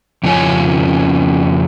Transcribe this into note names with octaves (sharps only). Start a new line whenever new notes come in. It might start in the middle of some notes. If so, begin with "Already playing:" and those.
F2 C#3 F3 C#4 C#5 G#5